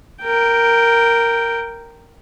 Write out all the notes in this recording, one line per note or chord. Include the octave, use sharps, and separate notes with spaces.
A#4 G5